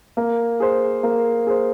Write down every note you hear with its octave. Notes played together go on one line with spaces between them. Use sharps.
A#3
G#4 C5
A#3
G#4 C5